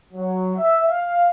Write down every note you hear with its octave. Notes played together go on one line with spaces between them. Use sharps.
F#3
E5
F5